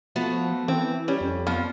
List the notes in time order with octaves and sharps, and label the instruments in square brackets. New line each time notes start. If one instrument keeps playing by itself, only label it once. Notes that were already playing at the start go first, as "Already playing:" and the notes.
[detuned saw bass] F3 [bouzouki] A3 B3 F#4
[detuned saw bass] E3 [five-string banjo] C4
[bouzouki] G3 [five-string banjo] C#4
[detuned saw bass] F2
[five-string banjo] F3 [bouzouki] B3